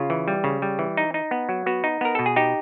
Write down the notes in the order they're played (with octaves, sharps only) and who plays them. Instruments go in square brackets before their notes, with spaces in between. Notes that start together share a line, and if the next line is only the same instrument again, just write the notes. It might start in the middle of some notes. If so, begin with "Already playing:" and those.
Already playing: [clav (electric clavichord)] C#3 F4
E3
G3
C#3
G3
E3
D#4
D#4
B3
F#3
B3 F#4
D#4
B3 A#4
B2 A4
G#4
D#4 G4